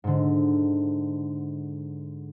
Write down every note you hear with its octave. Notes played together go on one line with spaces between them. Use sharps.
G#2 D3